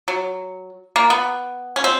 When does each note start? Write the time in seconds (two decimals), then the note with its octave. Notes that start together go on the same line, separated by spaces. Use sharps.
0.08 F#3
0.96 A#3
1.10 B3
1.76 C#4
1.84 C4